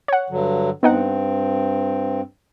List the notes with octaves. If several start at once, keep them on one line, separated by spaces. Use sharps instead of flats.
C#5 F#5
G2 D3 F#3
G2 B3 C4 D#4 F#5